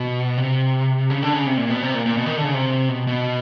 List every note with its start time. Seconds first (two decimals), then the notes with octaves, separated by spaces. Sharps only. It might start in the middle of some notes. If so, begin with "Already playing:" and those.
Already playing: B2
0.38 C3
1.10 C#3
1.22 D3
1.34 C#3
1.46 C3
1.58 A#2
1.70 B2
1.82 C3
1.94 A#2
2.06 A#2
2.17 B2
2.26 D#3
2.36 D3
2.44 C#3
2.54 C3
2.89 B2
3.07 B2